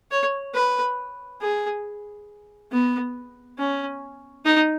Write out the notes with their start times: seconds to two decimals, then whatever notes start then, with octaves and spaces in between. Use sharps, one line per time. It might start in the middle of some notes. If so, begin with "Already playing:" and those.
0.11 C#5
0.55 B4
1.41 G#4
2.72 B3
3.58 C#4
4.45 D#4